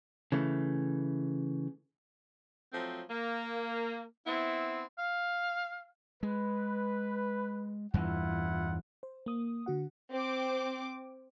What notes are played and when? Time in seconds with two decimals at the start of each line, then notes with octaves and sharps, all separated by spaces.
0.32 C#3 E3 A3
2.73 F3 F#3 A3 C4
3.10 A#3
4.27 B3 C4 E4
4.99 F5
6.23 G#3 B4
7.94 E2 G2 E3 E4 F4 F#5
9.03 C5
9.26 A#3 D#6
9.66 D3 F#4 F#5
10.13 C4 D6